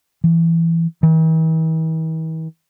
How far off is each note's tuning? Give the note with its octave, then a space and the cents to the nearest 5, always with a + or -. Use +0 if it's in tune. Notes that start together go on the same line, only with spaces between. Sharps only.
E3 +15
E3 -45